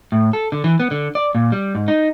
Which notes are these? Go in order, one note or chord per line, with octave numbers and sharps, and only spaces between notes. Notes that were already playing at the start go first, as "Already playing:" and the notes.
A2
A4
D3
E3
B3
D3
D5
A#2
G3
G#2
D#4